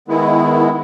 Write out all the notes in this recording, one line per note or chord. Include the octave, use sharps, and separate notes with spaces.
D#3 G#3 B3 E4